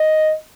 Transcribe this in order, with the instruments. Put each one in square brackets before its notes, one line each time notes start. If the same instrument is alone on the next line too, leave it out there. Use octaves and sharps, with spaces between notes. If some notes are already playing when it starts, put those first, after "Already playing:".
Already playing: [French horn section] D#5